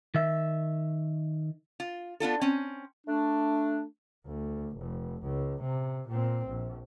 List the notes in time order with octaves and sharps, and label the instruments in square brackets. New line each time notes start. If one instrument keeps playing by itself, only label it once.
[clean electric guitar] D#3 E5
[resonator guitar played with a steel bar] F4
B3 D4 F4 A4
C4 C#4
[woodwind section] A3 D4
[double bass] D2
F1
C#2
C3
A#2 C4
A#1